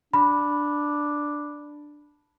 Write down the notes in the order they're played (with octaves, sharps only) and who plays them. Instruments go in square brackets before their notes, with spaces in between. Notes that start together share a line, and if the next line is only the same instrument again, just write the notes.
[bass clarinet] D4 [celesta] B5